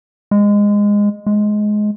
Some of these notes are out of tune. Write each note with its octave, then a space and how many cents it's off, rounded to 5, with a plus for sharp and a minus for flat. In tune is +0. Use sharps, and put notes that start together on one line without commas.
G#3 -15
G#3 +15